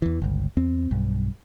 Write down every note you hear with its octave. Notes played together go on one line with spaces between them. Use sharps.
E2 E3
G1 C#2
E2 C4
B1 G2